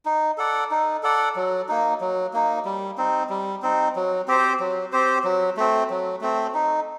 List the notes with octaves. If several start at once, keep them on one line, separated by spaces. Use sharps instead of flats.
D#4
A4 D5 F#5
D#4
A4 D5 F#5
F#3
A#3 D#4
F#3
A#3 D#4
G3
C4 D#4
G3
C4 D#4
F#3
C4 G4 C5
F#3
C4 G4 C5
F#3
A3 C4
F#3
A3 C4
D#4